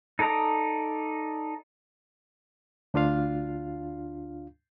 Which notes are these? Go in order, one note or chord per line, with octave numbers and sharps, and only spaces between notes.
D#4 A4 D5 A#5 D#6
D2 D4 F4 F5